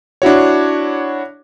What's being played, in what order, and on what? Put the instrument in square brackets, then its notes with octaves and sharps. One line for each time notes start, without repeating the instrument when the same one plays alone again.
[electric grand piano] D4 E4 F#4 C#5